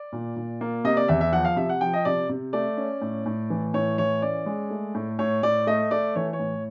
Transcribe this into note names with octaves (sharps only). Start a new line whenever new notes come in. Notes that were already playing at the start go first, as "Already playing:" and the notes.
Already playing: D5
A#2
A#2
A#3
C3 D#5
D5
E2 E5
E5
F3 F#5
F5
C3 E5
F#5
F3 G5
D#5
C3 D5
C3
A3 D5
C#4
A2
A2
E3
A2 C#5
E3 C#5
C#4 D5
G#3
A3
A2
A2 C#5
A2 D5
A3 D#5
A3 D5
E3 C#5
C#5
A2